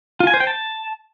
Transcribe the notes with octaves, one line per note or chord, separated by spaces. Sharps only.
F4
G#5
C5
G5
A5